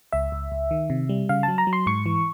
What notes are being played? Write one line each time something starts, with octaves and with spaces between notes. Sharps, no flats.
C#2 E5
C#2
C#2
D#3
C3
G3
C#3 F5
A5
F#3
A#5
F#3
C6
G#2 C#6
E3